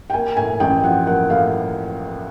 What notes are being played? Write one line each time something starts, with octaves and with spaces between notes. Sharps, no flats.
G5
A#3 G#5
A2 G#5
A1 G5
F3 F#5
A#3 F#5
A2 F5